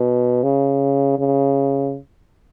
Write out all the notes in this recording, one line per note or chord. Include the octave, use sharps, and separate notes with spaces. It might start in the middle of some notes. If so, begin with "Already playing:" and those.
Already playing: B2
C#3
C#3